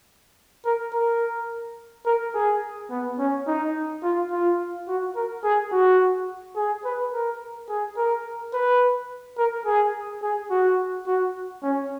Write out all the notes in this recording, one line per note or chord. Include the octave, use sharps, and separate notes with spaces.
A#4
A#4
A#4
G#4
B3
C#4
D#4
F4
F4
F#4
A#4
G#4
F#4
G#4
B4
A#4
G#4
A#4
B4
A#4
G#4
G#4
F#4
F#4
C#4